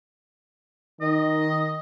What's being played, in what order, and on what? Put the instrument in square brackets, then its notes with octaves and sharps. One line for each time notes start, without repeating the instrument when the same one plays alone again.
[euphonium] D#3 [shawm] D#5